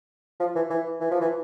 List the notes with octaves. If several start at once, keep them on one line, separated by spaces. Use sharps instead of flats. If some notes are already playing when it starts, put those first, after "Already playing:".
F3
E3
E3
E3
F3
E3